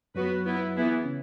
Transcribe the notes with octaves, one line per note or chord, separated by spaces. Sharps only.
F#2 F#3 B3 F#4 B4
B3 E4 B4
E3 B3 E4 G#4
C#3 C#4